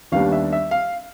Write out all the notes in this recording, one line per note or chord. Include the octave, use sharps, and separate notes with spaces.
D#2 D#3 G3 B3 D4 F5
E5
E5
F5